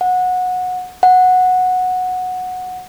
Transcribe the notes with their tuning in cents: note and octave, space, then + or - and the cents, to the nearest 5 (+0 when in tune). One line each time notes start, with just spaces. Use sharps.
F#5 -20
F#5 -10